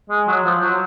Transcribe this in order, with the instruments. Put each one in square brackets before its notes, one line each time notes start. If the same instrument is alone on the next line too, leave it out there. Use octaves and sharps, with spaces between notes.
[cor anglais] G#3
F#3
F3
F#3